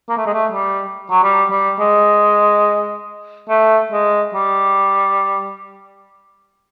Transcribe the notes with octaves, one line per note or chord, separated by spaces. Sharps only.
A#3
A3
G#3
A3
G3
F#3
G3
G3
G#3
A3
G#3
G3